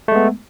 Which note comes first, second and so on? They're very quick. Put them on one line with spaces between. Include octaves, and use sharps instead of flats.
A3 G#3 B3